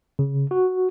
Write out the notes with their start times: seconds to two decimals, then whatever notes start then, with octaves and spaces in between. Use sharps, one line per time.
0.19 C#3
0.51 F#4